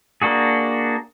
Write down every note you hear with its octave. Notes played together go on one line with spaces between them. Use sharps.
A#3 D4 F#4 G#4